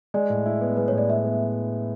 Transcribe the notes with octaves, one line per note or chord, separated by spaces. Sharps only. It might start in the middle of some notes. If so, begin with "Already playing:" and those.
G#3 D5
A2
E4
B3
G#3 B4
A2 C#5
D5
E4 E5
B3